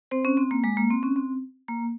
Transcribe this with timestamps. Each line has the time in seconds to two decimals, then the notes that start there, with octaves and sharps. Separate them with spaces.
0.11 C4 C5
0.25 C#4
0.37 C4
0.51 A#3
0.64 G#3
0.77 A#3
0.91 C4
1.03 C#4
1.16 C4
1.68 A#3